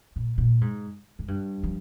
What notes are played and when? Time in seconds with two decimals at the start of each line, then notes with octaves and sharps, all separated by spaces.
0.16 A#2
0.38 A#2
0.61 G#2
1.19 G#2
1.28 G2
1.63 F3